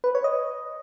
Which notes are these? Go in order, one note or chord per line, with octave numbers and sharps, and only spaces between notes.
B4
C#5
D#5